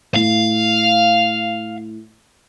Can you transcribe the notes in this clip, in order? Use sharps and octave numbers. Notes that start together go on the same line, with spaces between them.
A2 F5